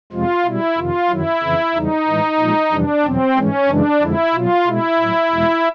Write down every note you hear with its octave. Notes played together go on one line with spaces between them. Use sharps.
F2 C3 F3 G#3 F4
B2 G3 E4
F2 C3 D#3 F4
F#2 D#3 F#3 E4
F2 C#3 E3
E2 C#3 E3 G3 D#4
A2 E3 G#3
A#2 F3 G#3
F2 C3 E3 G3 D4
E2 B2 F#3 C4
G#2 E3 G#3 C#4
F#2 C#3 E3 G#3 D4
F2 D3 F3 G#3 E4
B2 F#3 F4
B2 G#3 E4
A2 F#3
E2 B2 G#3